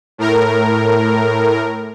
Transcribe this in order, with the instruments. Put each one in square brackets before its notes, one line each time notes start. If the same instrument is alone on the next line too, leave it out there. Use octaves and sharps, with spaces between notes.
[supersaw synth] A2 A#4